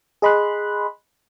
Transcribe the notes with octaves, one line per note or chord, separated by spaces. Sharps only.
G#4 D#5 B5 C6 F#6